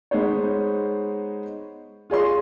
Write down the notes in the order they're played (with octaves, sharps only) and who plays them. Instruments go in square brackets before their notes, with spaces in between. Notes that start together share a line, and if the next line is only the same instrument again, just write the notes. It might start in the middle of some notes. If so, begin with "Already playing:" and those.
[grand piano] G#3 B3 D#4 C5 C#5
F4 G#4 C#5 C6